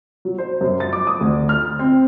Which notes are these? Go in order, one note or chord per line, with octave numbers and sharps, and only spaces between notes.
F#3
C5
F#2
A6
D6
D#6
D2
F6
C4